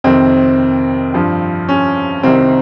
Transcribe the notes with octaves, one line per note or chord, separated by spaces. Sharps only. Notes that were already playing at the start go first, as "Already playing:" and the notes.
F2 C3 D#3 C4
G2 F3
C#4
C2 C3 D#3 C4